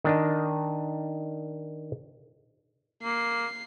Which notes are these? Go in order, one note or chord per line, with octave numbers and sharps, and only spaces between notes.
D#3 D4 D#5
A#3 C7